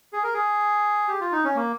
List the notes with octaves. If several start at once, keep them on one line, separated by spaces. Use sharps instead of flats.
G#4
A#4
G#4
G4
F4
D#4
C#4
A#3